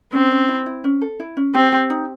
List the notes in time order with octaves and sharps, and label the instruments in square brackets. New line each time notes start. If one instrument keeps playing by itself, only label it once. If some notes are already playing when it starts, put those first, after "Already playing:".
[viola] C4 [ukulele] C#4
[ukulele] C#4
E4
E4
C#4
A4
E4
C#4
[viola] C4 [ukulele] G4
[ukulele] G4
D#4